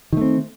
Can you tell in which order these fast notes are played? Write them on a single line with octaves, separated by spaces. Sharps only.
D#3 A3 C4